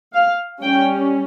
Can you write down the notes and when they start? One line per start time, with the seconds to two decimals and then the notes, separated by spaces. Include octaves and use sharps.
0.14 F5
0.63 G3 C#4 G5